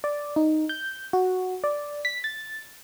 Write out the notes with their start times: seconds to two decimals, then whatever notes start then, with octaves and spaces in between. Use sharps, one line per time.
0.04 D5
0.36 D#4
0.69 G6
1.13 F#4
1.64 D5
2.05 B6
2.24 A6